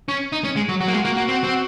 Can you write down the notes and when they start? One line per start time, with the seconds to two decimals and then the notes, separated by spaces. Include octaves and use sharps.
0.08 C#4
0.32 D#4
0.44 C#4
0.56 G#3
0.69 F#3
0.80 F#3 F#4
0.88 A#3
0.93 G#3 F4
1.04 A#3 F#4
1.17 A#3
1.28 C4
1.44 C4